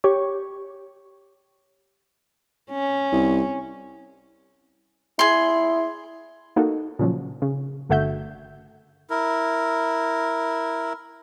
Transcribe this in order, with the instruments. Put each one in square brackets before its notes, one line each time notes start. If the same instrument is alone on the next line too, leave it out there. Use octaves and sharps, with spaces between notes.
[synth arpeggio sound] G4 C#5 C#6
[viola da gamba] C#4
[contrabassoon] C2
[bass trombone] E4 [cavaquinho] G#4 C6
[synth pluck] A#3 D#4 F#4 A4
A#2 C#3 F3 F#3
C#3
G1 D3 A3 F#4 E5 G6
[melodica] E4 A#4